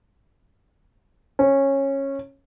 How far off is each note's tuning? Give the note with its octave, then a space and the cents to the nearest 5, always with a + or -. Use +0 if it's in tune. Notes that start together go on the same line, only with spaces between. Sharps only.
C#4 -15